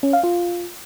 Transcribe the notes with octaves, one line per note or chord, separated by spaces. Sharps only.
C#4
F5
F4